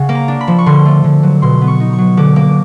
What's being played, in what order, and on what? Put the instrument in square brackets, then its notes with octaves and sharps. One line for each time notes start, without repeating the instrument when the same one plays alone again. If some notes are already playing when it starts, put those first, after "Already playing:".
Already playing: [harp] C#3 F#5
A#3
A#5
D4
B5
F3
C#6
D3 C6
A3
D3
F#3
B2 C6
B3
C#6
D#4
C#6
F#3
D3 D6
A#3 D6